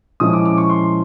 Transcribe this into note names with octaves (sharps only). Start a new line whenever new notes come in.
A#2 F3 G#3 C#4 E4 D#6
D6
D6
C#6
C6